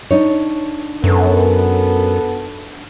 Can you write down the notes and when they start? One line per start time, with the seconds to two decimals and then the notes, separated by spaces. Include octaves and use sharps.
0.11 D4 D#4 C#5
1.04 F#2 B3 A4